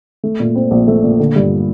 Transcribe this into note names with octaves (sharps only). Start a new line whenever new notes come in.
A3
A#2
C4
A#1
A3
A#2
D3
G2